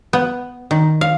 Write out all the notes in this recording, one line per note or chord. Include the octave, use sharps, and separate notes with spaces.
B3
D#3
F5